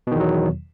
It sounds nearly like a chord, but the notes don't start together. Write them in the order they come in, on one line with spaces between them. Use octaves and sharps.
B2 D#3 E2 F#3